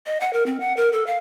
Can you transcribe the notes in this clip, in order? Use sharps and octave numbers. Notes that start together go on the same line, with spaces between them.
D#5
F#5
A#4
C4
F#5
A#4
A4
F5